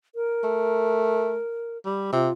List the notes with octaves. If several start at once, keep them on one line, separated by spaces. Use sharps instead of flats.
A#4
A3
G3
C3 F4